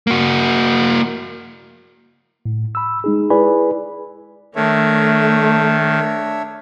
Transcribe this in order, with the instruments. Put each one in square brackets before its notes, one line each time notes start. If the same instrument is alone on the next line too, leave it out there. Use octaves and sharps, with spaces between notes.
[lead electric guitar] A#3 F#4
[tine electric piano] A2
B5 E6
G#3 D#4 G#4
E4 G#4 B4 D5 G#5 B5
[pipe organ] D#3 [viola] A3 [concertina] D4 C#5 E5